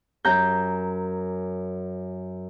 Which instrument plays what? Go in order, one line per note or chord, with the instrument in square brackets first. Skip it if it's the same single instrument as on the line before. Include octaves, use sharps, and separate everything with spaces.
[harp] F#2 A#5 G6